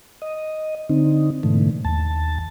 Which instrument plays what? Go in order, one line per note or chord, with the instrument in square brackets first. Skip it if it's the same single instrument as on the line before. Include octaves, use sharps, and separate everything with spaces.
[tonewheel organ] D#5
D3 C4 D#4
G#2 B2 D3 E3 A3
D#2 A5